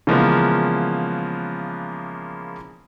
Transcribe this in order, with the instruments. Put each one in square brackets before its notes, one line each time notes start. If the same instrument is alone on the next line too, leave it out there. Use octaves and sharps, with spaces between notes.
[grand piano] C#3 E3 F3 G#3 A#3 B3